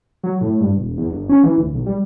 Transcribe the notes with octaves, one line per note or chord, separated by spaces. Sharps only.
F#3
A2
G2
E1
E2
G1
C#4
E3
D1
B1
G3